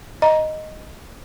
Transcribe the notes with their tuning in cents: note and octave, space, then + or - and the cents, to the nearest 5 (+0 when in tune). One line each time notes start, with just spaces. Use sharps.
D#5 +0 A#5 +15